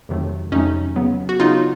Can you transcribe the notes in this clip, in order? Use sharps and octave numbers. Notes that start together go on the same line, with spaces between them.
F2 C3 D#3 F#3 A3
F2 C3 D#3 F#3 A3 C#4 D#4
C#3 F#3 B3
F#4
C#3 F#3 B3 D#4 F4